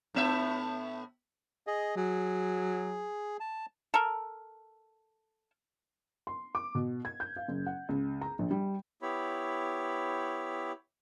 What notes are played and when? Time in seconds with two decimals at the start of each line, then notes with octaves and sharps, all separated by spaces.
0.14 A2 B3 E5
1.67 G#4 D#5
1.97 F#3 G#4
3.40 A5
3.94 A4 A#4
6.27 C6
6.55 D6
6.75 B2
7.05 G#6
7.20 G6
7.36 F5
7.48 F#1
7.66 F#5
7.89 C#2
8.21 A#5
8.39 A#1
8.51 G3
9.02 B3 E4 G4 C#5 B5